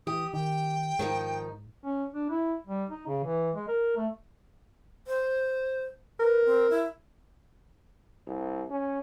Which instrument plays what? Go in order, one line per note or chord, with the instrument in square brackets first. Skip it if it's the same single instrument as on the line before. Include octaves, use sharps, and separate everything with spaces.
[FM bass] E3 [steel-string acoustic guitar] G4 [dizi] D#6
[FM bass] D#3 [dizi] G5
[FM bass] G#2 [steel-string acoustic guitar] D#3 F3 D#4
[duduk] C#4
D4
E4
G3
D#4
C#3
E3
G#3
A#4
A3
[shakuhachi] C5
[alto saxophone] A#4 [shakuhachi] B4
[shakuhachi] C4
E4
[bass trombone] C2
C#4